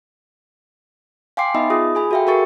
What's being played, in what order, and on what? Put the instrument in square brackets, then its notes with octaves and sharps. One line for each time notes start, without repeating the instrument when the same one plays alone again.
[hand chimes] F5 G5 G#5 C6 D6 C7
B3 D#4 D#5 E5 B5
F4 G#4 D#6
G#4 G#5 B5
F#4 A4 E5 F5 G5
F#4 G#4 A#4 C#6 A6 C#7